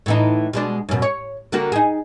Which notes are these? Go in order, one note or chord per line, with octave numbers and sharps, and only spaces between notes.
A2 E3 D#4
B2 G#3 D4
F#2 B2
C#5
D3 A#3 F#4
D#4 G#4